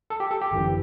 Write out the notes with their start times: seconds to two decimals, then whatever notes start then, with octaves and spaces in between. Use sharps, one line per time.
0.10 A4
0.20 G4
0.31 A4
0.42 G4
0.51 G1 F#2 E3